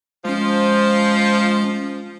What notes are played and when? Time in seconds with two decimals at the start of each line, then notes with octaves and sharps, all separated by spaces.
0.25 F3 G#3 C#4